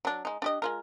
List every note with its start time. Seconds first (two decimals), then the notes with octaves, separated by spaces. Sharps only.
0.05 F#3 D4
0.25 G#3 D#4
0.42 D4 G4 D#5
0.62 G#3 F4 A#4